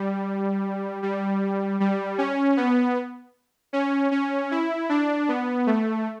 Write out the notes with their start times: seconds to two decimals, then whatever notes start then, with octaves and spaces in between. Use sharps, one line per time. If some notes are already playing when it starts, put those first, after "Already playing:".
Already playing: G3
1.03 G3
1.80 G3
2.18 C#4
2.57 B3
3.73 C#4
4.11 C#4
4.51 E4
4.89 D4
5.29 B3
5.67 A3